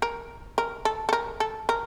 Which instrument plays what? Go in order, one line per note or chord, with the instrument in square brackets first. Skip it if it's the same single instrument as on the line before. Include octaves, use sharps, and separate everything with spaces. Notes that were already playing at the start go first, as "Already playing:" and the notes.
[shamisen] A#4
A#4
A4
A4
A#4
A4
A#4